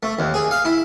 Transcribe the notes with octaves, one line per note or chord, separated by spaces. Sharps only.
A3
D#2
G#4
F5
E4